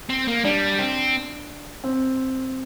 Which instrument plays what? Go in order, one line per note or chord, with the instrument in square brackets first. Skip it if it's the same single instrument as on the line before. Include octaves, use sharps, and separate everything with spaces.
[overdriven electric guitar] C4
A#3
[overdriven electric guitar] G3 [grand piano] D4
[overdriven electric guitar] C4
[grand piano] C4